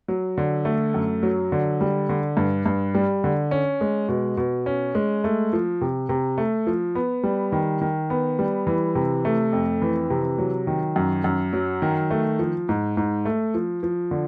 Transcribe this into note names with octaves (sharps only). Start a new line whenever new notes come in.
F#3
D3
A3
F#2
F#3
D3
G3
D3
G2
G2
G3
D3
C#4
G#3
B2
B2
C#4
G#3
A3
F3
C3
C3
A3
F3
B3
G3
D#3
D#3
B3
G3
E3
C3
A3
F2
E3
C3
F#3
D#3
F#2
F#2
F#3
D#3
A3
F3
G#2
G#2
A3
F3
F3
D3